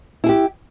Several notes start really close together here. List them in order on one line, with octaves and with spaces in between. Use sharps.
E4 G#4 G4